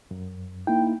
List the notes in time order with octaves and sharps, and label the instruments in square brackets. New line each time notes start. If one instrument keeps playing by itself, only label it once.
[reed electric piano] F#2
[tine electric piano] A#3 D#4 E4 [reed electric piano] G5